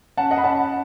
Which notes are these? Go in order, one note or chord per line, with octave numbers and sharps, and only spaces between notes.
C#4 F#5 A5
D#5 F#5
B5
C#4 F#5 A5